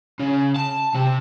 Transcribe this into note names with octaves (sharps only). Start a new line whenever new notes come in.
C#3
A5
C3